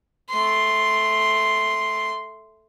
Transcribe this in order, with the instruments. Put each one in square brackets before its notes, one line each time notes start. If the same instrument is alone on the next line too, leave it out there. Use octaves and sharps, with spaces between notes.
[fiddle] A3 C6